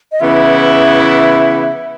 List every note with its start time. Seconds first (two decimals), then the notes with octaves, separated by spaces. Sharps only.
0.12 D#5
0.20 C#3 E3 B3 E4 E5